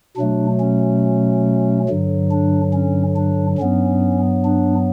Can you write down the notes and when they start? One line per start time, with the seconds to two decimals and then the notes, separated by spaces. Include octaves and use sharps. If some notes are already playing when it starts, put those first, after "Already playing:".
0.17 B2 F#3 A3 D4
0.60 C#4
1.88 G2 D3 F#3
2.31 D4
2.73 C#4
3.16 D4
3.59 G2 F#3 B3 C#4
4.45 D4